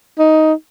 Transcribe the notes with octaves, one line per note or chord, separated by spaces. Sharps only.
D#4